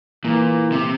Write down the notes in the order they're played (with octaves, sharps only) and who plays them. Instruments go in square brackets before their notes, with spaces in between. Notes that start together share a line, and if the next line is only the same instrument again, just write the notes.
[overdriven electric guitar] A#2 [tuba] E3
[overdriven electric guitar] C3